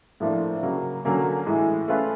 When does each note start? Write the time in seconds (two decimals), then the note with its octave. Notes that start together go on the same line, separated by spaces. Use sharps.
0.20 A2 F3 A#3 D4 F4
0.63 C#3 F#3 A#3
1.05 D3 F#3 A#3 C#4
1.46 A2 E3 G#3
1.88 A3 C#4 F4 G#4 B4